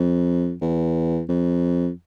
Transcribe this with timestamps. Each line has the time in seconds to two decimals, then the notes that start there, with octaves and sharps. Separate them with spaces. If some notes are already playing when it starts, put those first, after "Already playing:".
Already playing: F2
0.61 E2
1.29 F2